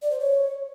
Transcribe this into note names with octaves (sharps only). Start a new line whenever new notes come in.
D5
C5
C#5